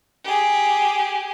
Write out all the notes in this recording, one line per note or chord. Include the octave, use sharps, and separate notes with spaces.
G4 G#4